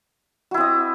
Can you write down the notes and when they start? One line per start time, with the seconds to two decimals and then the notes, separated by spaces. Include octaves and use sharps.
0.51 F#4
0.54 E4
0.57 C4
0.60 D#5